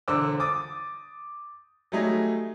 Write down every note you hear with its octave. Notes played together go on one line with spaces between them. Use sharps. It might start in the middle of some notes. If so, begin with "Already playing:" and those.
E1 D3 C5 C6 D6 E6
D6 D#6 A6
F#3 G3 A3 D#4 G#4